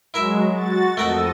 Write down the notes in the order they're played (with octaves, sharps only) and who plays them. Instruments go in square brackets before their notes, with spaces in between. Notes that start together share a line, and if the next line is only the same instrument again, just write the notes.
[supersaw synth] F#3 G#3 [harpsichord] E4 A#4 E5
[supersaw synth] F#4 A6
[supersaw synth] F2 A4 D#5 [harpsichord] A3 A#4 F#5